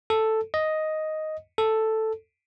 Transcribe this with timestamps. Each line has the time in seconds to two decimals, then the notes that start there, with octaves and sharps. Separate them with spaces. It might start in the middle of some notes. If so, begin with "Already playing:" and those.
0.10 A4
0.54 D#5
1.58 A4